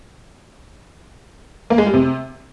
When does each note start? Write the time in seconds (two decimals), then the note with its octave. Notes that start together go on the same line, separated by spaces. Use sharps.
1.70 A#3
1.78 G#3
1.86 G3
1.94 C3